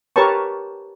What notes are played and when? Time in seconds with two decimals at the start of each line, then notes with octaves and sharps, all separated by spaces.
0.16 G4 A#4 B4 C#5 A5 C#6